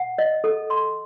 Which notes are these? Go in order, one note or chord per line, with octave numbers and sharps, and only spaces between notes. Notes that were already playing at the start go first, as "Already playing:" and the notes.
Already playing: F#5
D#5
A4
C6